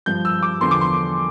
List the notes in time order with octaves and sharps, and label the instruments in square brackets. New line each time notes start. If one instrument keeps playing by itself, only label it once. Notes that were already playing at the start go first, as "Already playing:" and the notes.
[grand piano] G2 F3 G6
E6
D6
E2 D3 F3 C6
D6
C6